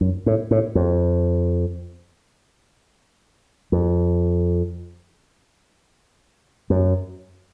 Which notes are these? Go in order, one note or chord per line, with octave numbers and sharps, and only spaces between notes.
F#2
A2
A2
F2
F2
F#2